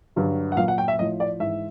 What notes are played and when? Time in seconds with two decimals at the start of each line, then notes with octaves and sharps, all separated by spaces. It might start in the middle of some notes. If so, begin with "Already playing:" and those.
0.16 G2 D3 F#3
0.52 F#5
0.57 A#2 F#3 F5
0.68 F#5
0.78 G5
0.88 E5
0.99 A2 F3 D#5
1.20 D5
1.40 G#2 E3 E5